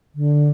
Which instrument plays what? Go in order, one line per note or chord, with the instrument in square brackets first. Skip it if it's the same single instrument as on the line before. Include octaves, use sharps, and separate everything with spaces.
[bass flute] D3